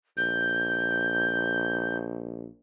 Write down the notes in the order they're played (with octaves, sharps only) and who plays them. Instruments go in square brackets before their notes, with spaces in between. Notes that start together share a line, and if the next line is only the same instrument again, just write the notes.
[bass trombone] A#1 [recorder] G6